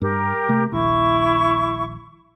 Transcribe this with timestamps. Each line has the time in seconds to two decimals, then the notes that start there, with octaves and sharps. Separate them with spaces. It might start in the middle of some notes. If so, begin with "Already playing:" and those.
0.02 G2 G4 A#4
0.49 C3 A3
0.72 D#1 A#1 D#2 E4 C#6